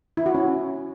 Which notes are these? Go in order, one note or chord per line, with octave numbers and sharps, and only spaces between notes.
E4
F#4
C#4